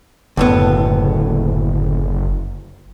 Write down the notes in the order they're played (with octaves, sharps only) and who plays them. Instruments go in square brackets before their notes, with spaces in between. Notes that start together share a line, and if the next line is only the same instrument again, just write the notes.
[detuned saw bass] F#1 [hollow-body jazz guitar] D2 A2 B3